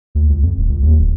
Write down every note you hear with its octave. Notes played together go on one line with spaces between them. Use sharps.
D2
C#2
F2
D#1
C#2
D#2
D1